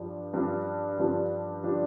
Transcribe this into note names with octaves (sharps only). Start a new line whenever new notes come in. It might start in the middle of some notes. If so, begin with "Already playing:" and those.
Already playing: G2 F3 D4 G4
G2 F3 D4 G4
G2 F3 D4 G4
F3 D4 G4